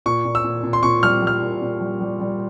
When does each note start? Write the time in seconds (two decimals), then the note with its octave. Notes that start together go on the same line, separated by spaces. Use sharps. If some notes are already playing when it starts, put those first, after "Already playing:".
0.06 A#2 C#6
0.25 A#2
0.35 E6
0.44 A#2
0.64 A#2
0.73 C6
0.83 A#2 C#6
1.03 G3 F6
1.22 G3 F6
1.42 A#2
1.62 A#2
1.80 G3
2.00 G3
2.20 G3